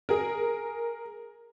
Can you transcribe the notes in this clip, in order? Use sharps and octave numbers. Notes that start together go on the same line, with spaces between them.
G#4 A#4